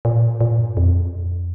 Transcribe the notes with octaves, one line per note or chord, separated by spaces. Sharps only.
A#2
A#2
G2
F2